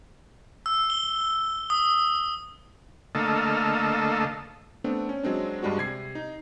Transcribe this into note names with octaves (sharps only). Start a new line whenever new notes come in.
E6
G7
D#6
D3 A3 A#3 A4 D#5 F5
A3 B3 C4 D4
C#4
F#3 G#3 C4 D4
G2 G3 G#3 D4 F#4
C3 G#6 C7
D#4